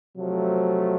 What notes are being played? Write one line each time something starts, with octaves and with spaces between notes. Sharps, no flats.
C3 F3 F#3 A3